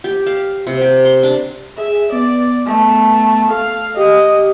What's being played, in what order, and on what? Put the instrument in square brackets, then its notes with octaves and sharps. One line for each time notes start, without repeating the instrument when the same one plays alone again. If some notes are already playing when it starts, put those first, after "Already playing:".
[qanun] G4
F5
C3
G4
C6
D4
[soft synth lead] G#4 [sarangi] E5
[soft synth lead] B3 [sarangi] D5
[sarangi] A3
[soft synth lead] A4 [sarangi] F5
[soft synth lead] G4 [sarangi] D#5